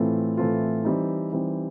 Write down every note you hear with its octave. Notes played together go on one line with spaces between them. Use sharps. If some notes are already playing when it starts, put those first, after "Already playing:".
Already playing: A2 E3 A3 C4 F4
A2 E3 A3 C4 F4
E3 G3 C4 D#4
E3 G3 C4 D#4